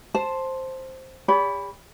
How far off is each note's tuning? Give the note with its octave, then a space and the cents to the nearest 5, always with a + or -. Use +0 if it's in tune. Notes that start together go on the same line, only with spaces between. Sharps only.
C5 +5 A5 +0
G4 +40 D5 -45 B5 +0